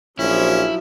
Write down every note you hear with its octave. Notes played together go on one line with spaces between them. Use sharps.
A#1 F3 F#3 C#4 E4